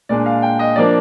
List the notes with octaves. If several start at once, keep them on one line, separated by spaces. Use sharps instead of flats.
A#2 G#3 D4 D5
F5
G5
D#5
F3 A#3 D4 D5